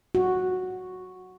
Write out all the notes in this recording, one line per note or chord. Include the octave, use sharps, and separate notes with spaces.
F#4